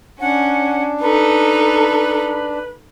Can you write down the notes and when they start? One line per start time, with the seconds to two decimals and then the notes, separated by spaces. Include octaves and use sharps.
0.20 C#4 D4 F#5
1.01 D#4 A4 B4